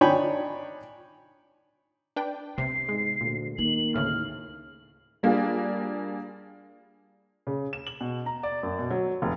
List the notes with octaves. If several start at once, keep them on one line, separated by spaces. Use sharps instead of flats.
D4 D#4 C#5 G5 G#5 B5
D4 B4 G5
C3 B3 C7
G#2 G#3
D2 A#2
D#3 A#3 F#7
D2 A2 C#3 F6
G3 A#3 D4 F4 G4 G#4
C#3
E7
F#7
B2
A#5
D5
F#2
B2
F#3
F1